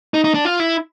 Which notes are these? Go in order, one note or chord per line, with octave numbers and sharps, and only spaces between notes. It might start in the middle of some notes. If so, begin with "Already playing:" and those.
D#4
D#4
D4
F4
E4